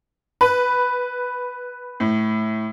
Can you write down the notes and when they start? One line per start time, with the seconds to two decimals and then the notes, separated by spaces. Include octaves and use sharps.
0.41 B4
2.00 A2